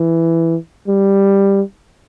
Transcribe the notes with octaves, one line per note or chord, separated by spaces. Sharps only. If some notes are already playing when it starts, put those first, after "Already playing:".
Already playing: E3
G3